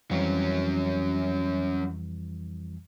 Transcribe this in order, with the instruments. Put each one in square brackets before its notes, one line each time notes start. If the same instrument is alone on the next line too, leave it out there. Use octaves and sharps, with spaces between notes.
[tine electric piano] F2 E3 G3 [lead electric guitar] F#3 C#4